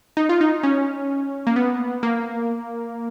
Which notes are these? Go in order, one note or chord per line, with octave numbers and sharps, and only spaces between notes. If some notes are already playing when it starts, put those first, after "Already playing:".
D#4
F4
D#4
C#4
A#3
B3
A#3